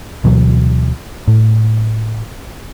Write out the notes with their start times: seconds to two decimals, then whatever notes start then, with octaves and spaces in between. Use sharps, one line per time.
0.24 D2 B2 E3 F#3
1.28 A2